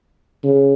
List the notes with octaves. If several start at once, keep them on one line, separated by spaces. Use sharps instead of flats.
C#3